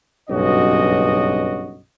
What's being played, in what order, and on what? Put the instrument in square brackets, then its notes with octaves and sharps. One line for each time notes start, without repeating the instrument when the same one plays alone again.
[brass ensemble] F#1 B1 G2 C#4 F#4 D#5